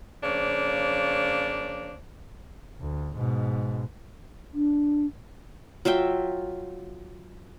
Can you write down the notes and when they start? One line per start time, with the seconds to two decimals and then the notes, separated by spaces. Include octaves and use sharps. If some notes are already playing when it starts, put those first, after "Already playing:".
0.23 F2 C#3 A#3 D4 C5 C#5
2.80 D2
3.17 G#2 B2
4.54 D4
5.85 F#3 F4 E5 G5